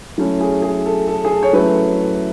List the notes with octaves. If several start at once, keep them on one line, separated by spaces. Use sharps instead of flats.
F#3 A3 C#4 E4
G#4
G#4
A4
A4
G#4
A4
C#5
F#3 A3 C#4 E4 B4